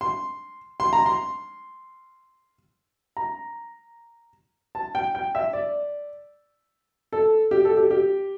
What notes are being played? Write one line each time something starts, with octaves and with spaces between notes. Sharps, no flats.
C6
C6
A#5
C6
A#5
A5
G5
G5
E5
D5
A4
G4
A4
G4
G4